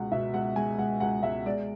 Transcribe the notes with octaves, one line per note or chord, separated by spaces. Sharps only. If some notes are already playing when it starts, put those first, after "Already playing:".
Already playing: C#2 B2 F#5
B2 E5
C#2 F#5
G#3 G#5
C#2 F#5
C#2 F#5
C#2 E5
G#3 D5